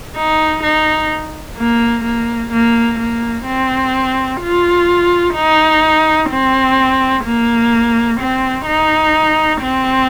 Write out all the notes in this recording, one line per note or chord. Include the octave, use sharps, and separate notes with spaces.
D#4
D#4
A#3
A#3
A#3
A#3
C4
F4
D#4
C4
A#3
C4
D#4
C4